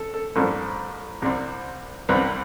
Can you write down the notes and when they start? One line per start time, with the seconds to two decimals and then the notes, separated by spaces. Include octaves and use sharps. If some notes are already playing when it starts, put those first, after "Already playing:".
Already playing: A4
0.14 A4
0.36 A1 G2 F3 C4 A4
1.22 C2 C3 G3 C4
2.09 C2 C3 G3 C4 B4